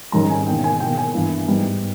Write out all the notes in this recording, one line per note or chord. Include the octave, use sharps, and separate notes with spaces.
G#1 G#2 D#3 G3 C#4 A#5
G#5
E1 E2 D#3 A#3 G5
G#5
E1 E2 D#3 A#3 G5
G#5
G2 E3 A#3 E4
G#2 G3 B3 D#4